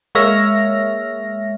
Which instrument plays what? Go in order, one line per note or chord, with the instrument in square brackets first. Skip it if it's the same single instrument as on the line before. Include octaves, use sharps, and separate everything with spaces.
[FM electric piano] G#3 A#3 C#5 E5 F6 A#6